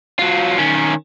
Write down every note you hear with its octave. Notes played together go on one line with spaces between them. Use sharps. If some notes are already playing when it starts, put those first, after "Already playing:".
F#3 F4
D#3 C#4